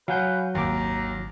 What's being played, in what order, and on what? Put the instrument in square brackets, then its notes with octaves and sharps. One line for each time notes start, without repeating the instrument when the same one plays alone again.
[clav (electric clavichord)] F#3 [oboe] B4 [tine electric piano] F5 G#5 G6
[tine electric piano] G#1 D6 [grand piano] D#2 [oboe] A#5